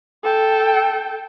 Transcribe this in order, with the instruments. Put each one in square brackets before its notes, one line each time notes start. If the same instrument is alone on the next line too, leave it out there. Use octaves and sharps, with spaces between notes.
[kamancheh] A4 G5